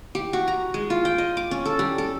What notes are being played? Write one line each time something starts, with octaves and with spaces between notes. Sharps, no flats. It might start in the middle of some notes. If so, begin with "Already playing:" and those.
G4
F#4
A#5
G#3
F4
G5
D#5
D6
C#4
A4
G3
A4